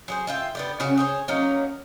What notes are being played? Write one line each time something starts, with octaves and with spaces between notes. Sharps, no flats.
F#3 G#4 C5
F4 E5 G5
B3 D4 G4
C#3 C#4 F#4 F#5
G#4 C5 C#5
F#3 A#3 C#4 D#4